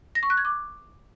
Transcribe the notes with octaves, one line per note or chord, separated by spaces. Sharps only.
A#6
C#6
F#6
G#6
D6